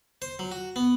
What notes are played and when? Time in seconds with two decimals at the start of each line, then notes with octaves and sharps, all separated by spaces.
0.22 C5
0.39 F#3
0.52 F#4
0.76 B3